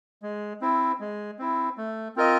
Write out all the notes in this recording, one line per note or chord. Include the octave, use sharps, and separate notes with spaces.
G#3
C4 E4
G#3
C4 E4
A3
C4 F4 A#4 D#5